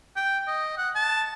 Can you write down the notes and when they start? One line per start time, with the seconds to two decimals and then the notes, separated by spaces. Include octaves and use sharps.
0.17 G5
0.48 D#5
0.78 F#5
0.96 A5